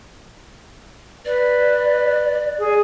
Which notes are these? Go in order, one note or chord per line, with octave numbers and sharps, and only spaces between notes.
B4 D5
G#4